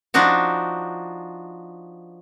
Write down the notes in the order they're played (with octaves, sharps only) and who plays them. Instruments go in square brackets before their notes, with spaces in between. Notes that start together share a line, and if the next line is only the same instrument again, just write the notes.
[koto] F3 D4 D#4 F#4